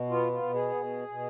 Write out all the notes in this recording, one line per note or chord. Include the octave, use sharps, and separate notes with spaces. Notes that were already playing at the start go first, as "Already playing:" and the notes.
Already playing: B2
B3 F4
F4
B2
G#4
B2
B2